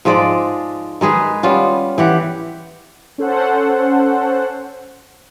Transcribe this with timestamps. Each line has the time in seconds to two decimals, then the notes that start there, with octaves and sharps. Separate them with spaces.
0.05 G#2 F3 G#3 D5
1.01 D#3 G#3 G#4 B4
1.43 G3 B3 C#4 F4
1.98 E3 G4 F#5
3.18 C#4 A4 C5 F#5